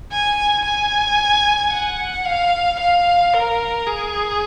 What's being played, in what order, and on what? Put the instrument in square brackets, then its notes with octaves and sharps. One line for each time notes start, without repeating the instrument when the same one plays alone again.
[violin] G#5
G#5
F#5
F5
F5
A#4
G#4